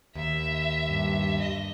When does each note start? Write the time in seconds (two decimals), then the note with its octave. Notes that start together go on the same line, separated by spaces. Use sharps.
0.15 D#2 E5
0.87 G2
1.40 D#5